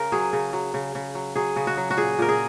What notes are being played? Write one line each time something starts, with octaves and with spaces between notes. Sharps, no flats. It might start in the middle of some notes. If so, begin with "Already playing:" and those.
Already playing: C#3 A#4
F#3 G#4
C#3
F#3
C#3
C#3
F#3
F#3 G#4
C#3
F#4
F#3
F#4
A#2 G#4
A#2 A#4
G#4